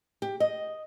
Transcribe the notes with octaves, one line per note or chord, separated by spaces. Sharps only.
G4
D#5